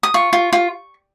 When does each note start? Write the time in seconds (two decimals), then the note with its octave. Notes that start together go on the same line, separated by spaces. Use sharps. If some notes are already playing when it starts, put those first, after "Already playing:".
0.03 D#6
0.14 F4 C#6
0.33 F4
0.53 F4